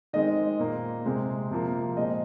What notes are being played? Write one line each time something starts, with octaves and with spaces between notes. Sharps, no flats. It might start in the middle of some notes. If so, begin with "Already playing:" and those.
D#3 G#3 C4 D#5
A#2 A#3
C3 G#3 C4
C3 F3 A#3
A#2 G#3 C4 D#5